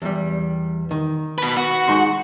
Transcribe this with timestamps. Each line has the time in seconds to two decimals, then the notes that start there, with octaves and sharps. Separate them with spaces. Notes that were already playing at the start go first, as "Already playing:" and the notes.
0.02 E2 G3
0.91 D#3
1.38 B2 B4
1.57 F#4
1.88 G#3 D#4 C6